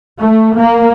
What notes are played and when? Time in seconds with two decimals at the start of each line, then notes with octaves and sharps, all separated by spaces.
0.22 A3
0.57 A#3